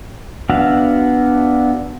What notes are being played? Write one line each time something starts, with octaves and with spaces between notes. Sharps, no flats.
B3 D4 F#4 E5 F5